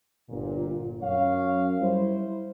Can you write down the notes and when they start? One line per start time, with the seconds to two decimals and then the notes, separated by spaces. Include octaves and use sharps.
0.29 G1 A#2
1.02 F#2 C#5 F5
1.81 G3 E4 C5